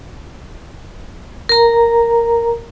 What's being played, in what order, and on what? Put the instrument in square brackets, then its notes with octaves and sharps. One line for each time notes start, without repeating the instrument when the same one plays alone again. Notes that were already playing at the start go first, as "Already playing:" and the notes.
[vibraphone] A#4 A#5